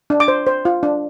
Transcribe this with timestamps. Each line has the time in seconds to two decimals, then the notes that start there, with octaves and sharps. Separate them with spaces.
0.10 D4
0.20 D6
0.28 C5
0.47 C5
0.65 F4
0.83 D4